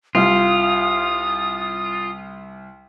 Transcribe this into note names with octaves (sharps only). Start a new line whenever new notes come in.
C2 F4 D#6